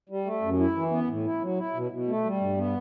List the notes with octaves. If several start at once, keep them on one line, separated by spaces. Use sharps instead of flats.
G3
A3
F#2
E4
E3
B3
A2
E4
F#3
E4
B2
B2
A3
G3
G2
B3